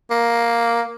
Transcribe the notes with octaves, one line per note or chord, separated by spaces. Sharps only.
A#3